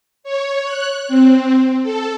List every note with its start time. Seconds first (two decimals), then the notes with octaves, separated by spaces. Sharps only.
0.24 C#5
0.64 F#6
1.08 C4
1.83 A4